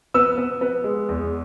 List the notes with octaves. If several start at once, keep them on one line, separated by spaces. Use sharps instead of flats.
B3 E6
B3
B3
G#3
E2